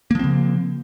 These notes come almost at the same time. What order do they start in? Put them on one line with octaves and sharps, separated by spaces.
A#3 F3 C4 C#3